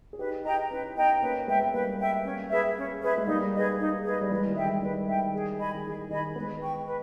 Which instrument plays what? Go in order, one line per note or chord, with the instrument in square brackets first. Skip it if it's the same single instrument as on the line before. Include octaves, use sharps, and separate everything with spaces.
[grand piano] G#4
[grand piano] D#4 G4 [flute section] B4
[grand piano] D#4 G4 [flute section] D#5 G5 A#5
[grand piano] C#4 E4 [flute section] B4
[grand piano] B3 D#4 [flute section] D#5 G5 A#5
[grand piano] A#3 C#4 [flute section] B4
[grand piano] G#3 B3 [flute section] E5 G5
[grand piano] B3
[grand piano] G3 A#3 [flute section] B4
[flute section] E5 G5
C#4
G#4 B4 E5
C#4
G#4 B4 E5
[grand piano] G#3
[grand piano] G3 A#3 [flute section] D#4
[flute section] G#4 B4 D#5
D#4
G#4 B4 D#5
[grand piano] G3
[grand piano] E3 G#3 [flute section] B4
[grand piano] D#3 G3
[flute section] E5 G5
[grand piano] E3 G#3
[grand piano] D#3 G3 [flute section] B4
[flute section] E5 G5
G#4
D#5 G#5 B5
[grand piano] D#3
[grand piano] E3 [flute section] G#4
[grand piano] D#3 [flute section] D#5 G#5 B5
[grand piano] G#3 B3 [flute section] B4
[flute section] G5 C#6
B4